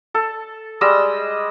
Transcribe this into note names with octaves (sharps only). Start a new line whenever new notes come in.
A4
G3 G#3 D#5 E6